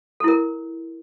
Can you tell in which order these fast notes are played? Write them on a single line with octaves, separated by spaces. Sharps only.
A4 E4 A#4